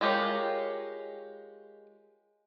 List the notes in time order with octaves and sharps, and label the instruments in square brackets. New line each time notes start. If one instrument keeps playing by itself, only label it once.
[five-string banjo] G#3 F4 G4 A#4 C#5